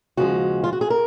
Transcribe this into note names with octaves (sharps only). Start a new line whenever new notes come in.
D#2 C#3 F3 G#3 F#4
F4
F#4
G#4
A#4